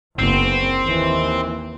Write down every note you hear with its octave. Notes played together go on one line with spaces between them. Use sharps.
F#1 B3 C4
D#2 E3